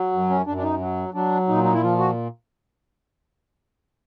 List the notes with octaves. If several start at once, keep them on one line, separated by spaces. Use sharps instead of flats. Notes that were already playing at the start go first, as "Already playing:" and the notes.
Already playing: F#3
F#2
C#4
F#2 D4
D4
D#4
F#3
F#3 D4
A#2 D#4
D#4
E4
F3 F4
F#4